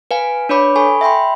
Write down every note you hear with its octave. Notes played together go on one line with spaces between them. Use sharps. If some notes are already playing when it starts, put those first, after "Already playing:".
B4 F5 G#5
D4 B4 C#5 B5 D6
A4 G#5 B5 C#6
E5 G5 B5 C6